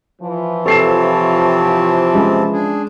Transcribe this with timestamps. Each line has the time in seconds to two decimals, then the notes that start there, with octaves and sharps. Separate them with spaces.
0.22 E3 F3
0.66 C3 C4 A4 C#5 A5 C7 E7
2.14 G#3 C#4
2.53 D4 G#4